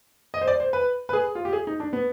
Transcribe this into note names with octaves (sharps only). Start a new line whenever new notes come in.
D#5
C5
D5
C5
B4
B4
G#4
F4
G4
G#4
D#4
D4
B3